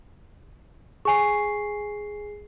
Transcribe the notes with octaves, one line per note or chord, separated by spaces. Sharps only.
G#4 G#5 C#6 C7